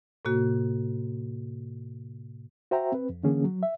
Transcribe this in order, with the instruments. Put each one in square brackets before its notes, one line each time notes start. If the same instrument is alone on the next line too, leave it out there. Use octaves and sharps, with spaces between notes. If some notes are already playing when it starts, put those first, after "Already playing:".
[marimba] A2 C3 A#3 F#4
[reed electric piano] F#4 C5 E5 G5 A#5
C4 B4
F2
D3 E3 A#3 C#4 G#4
F#3
E5